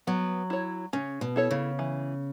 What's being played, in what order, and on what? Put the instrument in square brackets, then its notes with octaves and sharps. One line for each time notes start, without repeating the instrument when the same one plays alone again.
[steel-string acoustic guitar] F#3 [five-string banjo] B3
[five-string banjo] E4 C#5
[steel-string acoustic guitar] C#3 [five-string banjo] C#4
[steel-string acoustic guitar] B2
[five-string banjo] E4 A4 C#5
[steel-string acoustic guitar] C#3
[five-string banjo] E3